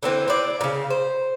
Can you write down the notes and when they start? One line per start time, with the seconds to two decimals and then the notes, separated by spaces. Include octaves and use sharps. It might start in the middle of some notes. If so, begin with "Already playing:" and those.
0.03 D3 E3 C4
0.28 C4 E4 D5
0.61 A#2 C#3
0.90 C5